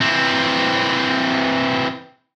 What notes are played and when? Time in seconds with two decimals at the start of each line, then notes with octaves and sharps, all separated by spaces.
0.01 E3 C4